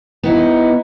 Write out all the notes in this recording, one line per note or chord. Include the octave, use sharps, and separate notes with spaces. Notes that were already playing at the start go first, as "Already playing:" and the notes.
B3 D#4 E4